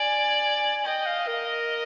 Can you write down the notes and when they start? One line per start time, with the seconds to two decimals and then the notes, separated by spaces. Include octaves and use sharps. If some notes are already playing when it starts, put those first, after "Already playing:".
Already playing: D5 G#5
0.85 D#5 G5
1.06 F5
1.27 A#4